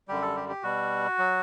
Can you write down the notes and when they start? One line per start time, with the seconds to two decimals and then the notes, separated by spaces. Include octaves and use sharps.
0.08 F#2 D3 G3 G4
0.22 A4
0.36 G4
0.49 G4
0.63 B2 G3 F#4
1.19 F#3